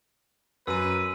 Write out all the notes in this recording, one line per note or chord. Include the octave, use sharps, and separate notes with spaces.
F#2 B4 E6 D#7